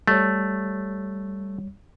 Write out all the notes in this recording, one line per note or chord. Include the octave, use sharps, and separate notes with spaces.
G3 A3 C#5